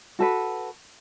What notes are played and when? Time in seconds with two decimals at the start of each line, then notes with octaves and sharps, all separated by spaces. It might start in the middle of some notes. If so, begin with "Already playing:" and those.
0.19 F#4 A4 B4